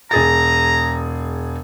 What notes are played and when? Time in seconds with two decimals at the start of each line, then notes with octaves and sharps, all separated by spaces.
0.11 E1 G#4 A#5 A6